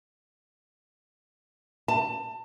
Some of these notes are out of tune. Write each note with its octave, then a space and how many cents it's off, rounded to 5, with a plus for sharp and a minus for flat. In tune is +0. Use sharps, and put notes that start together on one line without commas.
A5 +25